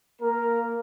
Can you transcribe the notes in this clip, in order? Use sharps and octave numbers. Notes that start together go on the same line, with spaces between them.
A#3 A#4